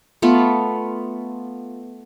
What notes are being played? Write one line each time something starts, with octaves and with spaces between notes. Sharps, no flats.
A3 B3 F4